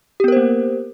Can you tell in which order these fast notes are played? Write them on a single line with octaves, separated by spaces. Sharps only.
G4 B3 A#4 C5 A#3